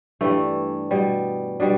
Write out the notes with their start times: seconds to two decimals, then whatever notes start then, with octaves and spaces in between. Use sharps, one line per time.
0.21 G2 E3 G3 A3
0.91 B2 G3
1.60 B2 G3 D4